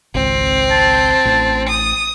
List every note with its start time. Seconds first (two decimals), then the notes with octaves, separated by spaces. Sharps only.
0.14 G#1 C#2 C4
0.71 A5
1.25 A1
1.69 D#6